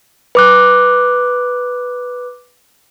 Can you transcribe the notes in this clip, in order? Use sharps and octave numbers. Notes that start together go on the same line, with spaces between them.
B4 D6 F#6